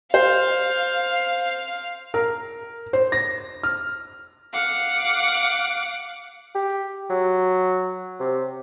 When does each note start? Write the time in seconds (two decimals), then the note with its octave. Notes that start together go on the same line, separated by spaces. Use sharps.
0.14 C5 F5
2.14 A#4
2.93 C5
3.12 A#6
3.63 F6
4.53 F5 F#5 D6
6.55 G4
7.10 F#3
8.20 C3